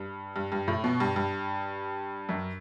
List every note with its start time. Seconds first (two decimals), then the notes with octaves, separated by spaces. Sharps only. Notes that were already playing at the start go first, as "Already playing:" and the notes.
Already playing: G2
0.36 G2
0.52 G2
0.68 A2
0.84 B2
1.00 G2
1.16 G2
2.29 F#2